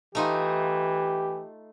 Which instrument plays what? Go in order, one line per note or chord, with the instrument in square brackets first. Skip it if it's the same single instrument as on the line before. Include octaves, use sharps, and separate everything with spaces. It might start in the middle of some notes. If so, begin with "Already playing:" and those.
[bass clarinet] E3 [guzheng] A3 D#4 F4 [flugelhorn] G4